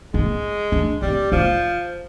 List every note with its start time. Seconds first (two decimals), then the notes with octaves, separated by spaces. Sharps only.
0.14 G#3 B3
0.72 D4
1.02 G3 C4
1.32 F3 B3